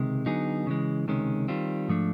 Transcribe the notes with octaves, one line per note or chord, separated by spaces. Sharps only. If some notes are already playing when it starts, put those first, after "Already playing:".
Already playing: C#2 C3 D#3 G#3
D3 F#3 B3 D#4 G#4
C#3 E3 G#3
C#2 C3 D#3 G#3 C#4
D#3 G3 C4 F4
G#2 F3 A3 D4